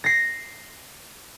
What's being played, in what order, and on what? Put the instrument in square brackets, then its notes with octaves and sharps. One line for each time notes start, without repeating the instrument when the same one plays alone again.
[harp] A#6 C7